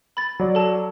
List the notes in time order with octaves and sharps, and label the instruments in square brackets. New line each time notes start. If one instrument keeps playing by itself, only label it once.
[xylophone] B5 A6
[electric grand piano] F#3 D5
[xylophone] A4 A5